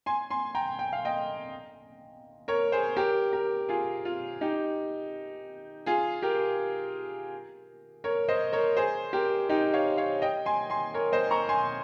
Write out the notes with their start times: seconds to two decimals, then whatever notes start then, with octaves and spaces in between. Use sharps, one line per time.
0.06 G#5 C6
0.30 G#5 C6
0.55 G5 A#5
0.79 G5
0.93 F5
1.05 D#5 G5
2.48 A#4 C#5
2.72 G#4 C5
2.96 G4 A#4
3.33 G4 A#4
3.69 F4 G#4
4.05 F4
4.41 D#4 G4
5.86 F4 G#4
6.22 G4 A#4
8.04 A#4 C#5
8.28 C5 D#5
8.53 A#4 C#5
8.77 G#4 C5
9.13 G4 A#4
9.49 D#4 G4
9.73 C#5 F5
9.97 C#5 F5
10.22 D#5 G5
10.46 G#5 C6
10.70 G#5 C6
10.94 A#4 C#5
11.12 C5 D#5
11.31 A#5 C#6
11.49 G#5 C6